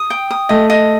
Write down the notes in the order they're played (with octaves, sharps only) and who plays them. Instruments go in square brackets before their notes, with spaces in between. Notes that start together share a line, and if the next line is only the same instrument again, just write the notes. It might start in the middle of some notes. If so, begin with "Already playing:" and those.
Already playing: [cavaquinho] D#6
G5
D#6
[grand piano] A3 [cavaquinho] D#5
[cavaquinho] D#5